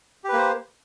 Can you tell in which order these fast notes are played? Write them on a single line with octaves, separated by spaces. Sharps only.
G4 B4 A#3 C5